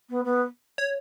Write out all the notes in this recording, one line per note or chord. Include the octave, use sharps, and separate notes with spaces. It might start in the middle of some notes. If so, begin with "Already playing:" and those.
B3
B3
C#5